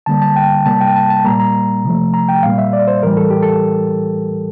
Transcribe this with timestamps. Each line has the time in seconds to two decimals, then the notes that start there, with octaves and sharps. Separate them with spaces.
0.06 D3 G3 A#3 A5
0.22 A5
0.36 G5
0.65 C3 G3 A#3 A5
0.81 G5
0.96 A5
1.10 A5
1.25 A#2 G3 A#3 A#5
1.40 A#5
1.84 C3 F3 A3
2.14 A#5
2.29 G5
2.43 A#2 G3 A#3 F5
2.58 E5
2.73 D5
2.88 C5
3.03 A2 E3 G3 A#4
3.17 A4
3.30 G4
3.43 A4